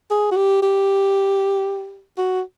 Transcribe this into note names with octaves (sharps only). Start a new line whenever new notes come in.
G#4
F#4
G4
G4
F#4